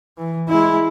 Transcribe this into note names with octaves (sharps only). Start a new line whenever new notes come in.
E3
G#3 E4